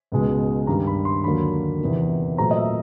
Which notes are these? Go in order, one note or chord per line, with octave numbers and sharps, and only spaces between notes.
C#2 B2 G#3
G2 D#3 G3 A#5
B5
C6
D#2 D3 F#3 A#3 B5
E2 C3 D#3
A#2 F#3 A3 C4 A#5
D#5
E5